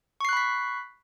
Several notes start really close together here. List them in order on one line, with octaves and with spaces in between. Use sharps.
C#6 C7 F#6 B5 B6